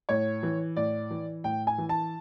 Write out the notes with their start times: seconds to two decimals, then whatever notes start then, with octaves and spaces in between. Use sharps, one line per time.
0.09 A2 C#5
0.43 E3
0.77 A2 D5
1.10 E3
1.44 A2 G5
1.67 G#5
1.78 E3
1.89 A5